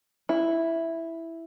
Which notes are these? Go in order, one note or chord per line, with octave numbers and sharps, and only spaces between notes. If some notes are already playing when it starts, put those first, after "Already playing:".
E4